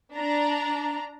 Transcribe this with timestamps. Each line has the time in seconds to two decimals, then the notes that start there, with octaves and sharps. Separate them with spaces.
0.16 D4 A#5